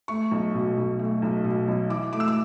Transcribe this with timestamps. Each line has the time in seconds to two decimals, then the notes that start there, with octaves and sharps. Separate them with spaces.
0.08 A3 C#6
0.31 B1
0.54 B2
0.77 B1
0.99 A3
1.22 B1
1.44 B2
1.68 B1
1.90 E3 D6
2.13 A3 D6
2.20 E6
2.28 D6